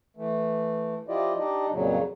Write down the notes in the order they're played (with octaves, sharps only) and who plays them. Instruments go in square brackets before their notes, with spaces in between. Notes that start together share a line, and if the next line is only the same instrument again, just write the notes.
[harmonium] E3 A3
F3 E4 F4 G4 D5 D#5
D4 D#4 G4 D5 D#5
F2 A#2 C#3 F#3